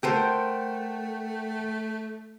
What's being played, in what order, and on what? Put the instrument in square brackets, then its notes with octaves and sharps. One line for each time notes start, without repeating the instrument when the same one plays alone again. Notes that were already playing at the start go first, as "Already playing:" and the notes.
[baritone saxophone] A3 [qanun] A4 A#4 C5 [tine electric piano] F#5 G5